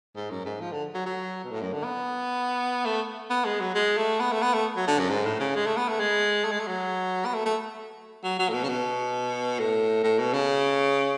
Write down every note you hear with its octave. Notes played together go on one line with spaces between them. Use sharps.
G#2
F#2
G#2
F3
D3
F#3
F#3
B2
A2
F#2
D3
B3
A3
B3
G#3
F#3
G#3
A3
B3
A3
B3
A3
F#3
D3
F#2
G#2
A2
C#3
G#3
A3
B3
A3
G#3
A3
G#3
A3
F#3
B3
A3
A3
F#3
F#3
A2
B2
C#3
B2
A2
A2
B2
C#3